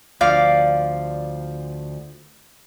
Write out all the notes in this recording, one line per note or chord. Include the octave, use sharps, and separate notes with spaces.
D2 F3 D5 F5